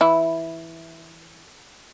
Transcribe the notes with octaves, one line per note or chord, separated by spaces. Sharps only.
E3 E4